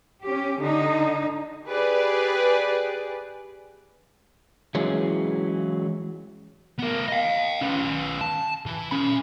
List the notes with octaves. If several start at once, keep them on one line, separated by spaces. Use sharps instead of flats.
C#4 G4
D3 D#4
G4 G#4 B4 D5
E3 F#3 G#3 C#4 E4 G#4
B3 A#4
D#5 F5
C#4 B4
A5
E3
C#4 B5